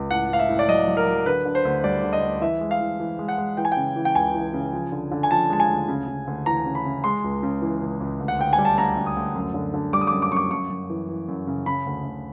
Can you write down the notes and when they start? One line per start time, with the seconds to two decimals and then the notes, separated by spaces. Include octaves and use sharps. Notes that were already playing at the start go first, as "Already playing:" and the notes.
Already playing: C#2
0.11 A2 F#5
0.30 A2 F5
0.39 E5
0.49 A2
0.59 D5
0.68 F#3 D#5
0.88 F#3
0.97 A#4
1.07 F#3
1.26 D3 B4
1.45 D3
1.55 C5
1.65 D2
1.84 G3 D5
2.03 D3
2.13 D#5
2.22 D2
2.41 E3 E5
2.61 G#3
2.71 F5
2.80 E3
3.00 E3
3.19 G#3
3.28 F#5
3.38 G#3
3.57 E3 G5
3.65 G#5
3.72 G5
3.77 C#3
3.96 E3
4.05 G5
4.15 C#2 G#5
4.34 E3
4.54 C#3
4.73 F3
4.92 D3
5.12 D3
5.23 G#5
5.31 F3 A5
5.50 G#3 A5
5.60 G#5
5.69 D2
5.88 C#3
6.08 C#3
6.27 D2
6.46 E3 A#5
6.65 C#3
6.75 B5
6.85 C#3
7.04 G#3 C6
7.24 C#2
7.43 C#3
7.62 E3
7.81 C#2
8.00 C#2
8.20 D2
8.28 F#5
8.39 D2 G5
8.53 G#5
8.58 G3
8.65 A5
8.78 D2 A#5
8.97 D2
9.06 D#6
9.16 D2
9.36 F#2
9.54 D3
9.74 D3
9.93 G3 D6
10.01 D#6
10.07 F#2 D6
10.22 D6
10.32 F#2 C#6
10.36 D6
10.51 F#2 C#6
10.70 F#2
10.90 E3
11.09 E3
11.29 F#2
11.47 C#3
11.66 C#3 B5
11.86 D2
12.05 D2